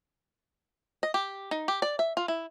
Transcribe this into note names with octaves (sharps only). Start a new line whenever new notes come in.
D#5
G4
D#4
G4
D5
E5
F4
E4